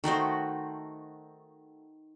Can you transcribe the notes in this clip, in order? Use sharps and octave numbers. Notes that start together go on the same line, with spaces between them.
D#3 A3 F#4 C5